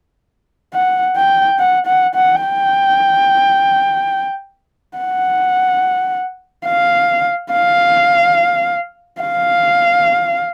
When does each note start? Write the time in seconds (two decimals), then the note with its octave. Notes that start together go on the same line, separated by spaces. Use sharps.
0.74 F#5
1.17 G5
1.59 F#5
1.87 F#5
2.15 F#5
2.43 G5
4.97 F#5
6.66 F5
7.52 F5
9.21 F5